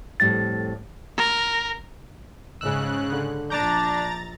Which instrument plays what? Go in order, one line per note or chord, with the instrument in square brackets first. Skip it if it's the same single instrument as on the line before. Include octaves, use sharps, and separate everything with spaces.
[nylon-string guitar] F2 A2 G3 [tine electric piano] A6
[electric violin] A#4
[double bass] G#2 [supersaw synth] C#3 F#6 [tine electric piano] E6
[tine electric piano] D3
[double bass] A#1 [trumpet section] D4 [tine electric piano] A5 D6 G6 [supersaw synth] A#5 A6